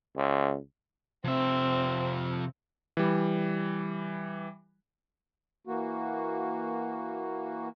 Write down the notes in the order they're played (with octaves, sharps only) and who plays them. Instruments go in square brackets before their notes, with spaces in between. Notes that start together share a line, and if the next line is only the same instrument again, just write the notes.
[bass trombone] C#2
[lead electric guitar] F2 E5 [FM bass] C3 [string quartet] C4
[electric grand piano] E3 G3
[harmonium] E3 A#3 F#4